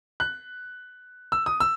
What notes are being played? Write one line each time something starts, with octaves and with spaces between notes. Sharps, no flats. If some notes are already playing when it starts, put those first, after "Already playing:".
F#6
E6
D#6
E6